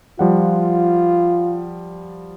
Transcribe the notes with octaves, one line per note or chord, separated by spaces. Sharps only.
F3 G3 F4 F#5